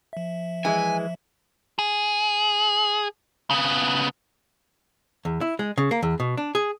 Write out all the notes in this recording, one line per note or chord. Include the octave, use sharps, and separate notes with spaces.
F3 E5
E3 G#3 G#5
G#4
C#3 B3
E2
E4
G#3
C#3
A#3
E2
B2
D4
G#4